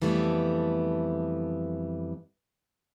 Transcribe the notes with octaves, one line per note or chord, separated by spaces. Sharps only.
F2 E3 G3 A3 B3